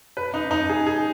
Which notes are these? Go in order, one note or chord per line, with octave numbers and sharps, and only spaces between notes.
B4
D#4
D#4
G#4
G#4